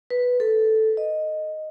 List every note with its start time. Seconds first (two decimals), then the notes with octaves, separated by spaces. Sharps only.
0.10 B4
0.40 A4
0.97 D#5